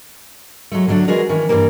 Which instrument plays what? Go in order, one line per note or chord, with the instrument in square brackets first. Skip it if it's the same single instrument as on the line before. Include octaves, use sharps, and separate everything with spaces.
[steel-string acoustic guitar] F#3 G#3 A3
D3 F#3 A3 C#4 D4
E3 G#3 F#4 G#4 A#4 D5
D#3 E3 C#4
G2 E3 F3 G3 G#3 A#3